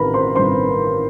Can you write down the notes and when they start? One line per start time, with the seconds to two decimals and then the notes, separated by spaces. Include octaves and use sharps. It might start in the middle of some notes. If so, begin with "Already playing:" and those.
Already playing: A1 D#3 A#4 B4 A#5 B5
0.14 C5 C6
0.35 A1 G2 D#3 C5 C6